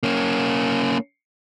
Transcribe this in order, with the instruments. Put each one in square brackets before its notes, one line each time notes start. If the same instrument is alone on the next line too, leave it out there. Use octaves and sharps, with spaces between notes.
[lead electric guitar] A#3 C#4